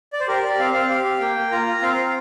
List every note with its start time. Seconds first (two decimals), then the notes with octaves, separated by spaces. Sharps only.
0.13 D5
0.20 C5
0.28 G4 A#4
0.43 G4 D5
0.59 C4 F5
0.74 C4 F5
0.90 G4 F5
1.04 G4
1.20 A#3 G5
1.36 A#3
1.51 F4 A#5
1.66 F4
1.82 C4 F5
1.97 C4